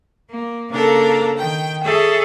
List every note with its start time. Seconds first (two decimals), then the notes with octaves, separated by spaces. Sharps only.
0.30 A#3
0.71 C#3 A#3 D4 A4 A#4
1.37 D#3 G5
1.83 G#4 A4 C#5 E5